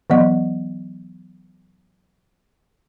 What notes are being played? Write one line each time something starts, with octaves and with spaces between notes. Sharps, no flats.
E3 F#3 B3 D#5